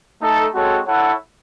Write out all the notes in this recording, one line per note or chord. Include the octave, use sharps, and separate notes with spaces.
A3 D#4 A4
G#3 C4 F#4 A4 C#5
E4 A4 C#5 F#5